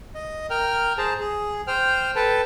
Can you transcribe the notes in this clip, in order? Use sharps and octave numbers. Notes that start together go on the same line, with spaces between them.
D#5
A#4 G5 F6
G#4 C5 A5 A#5
G#4
C5 G5 F6
A4 B4 G5 A5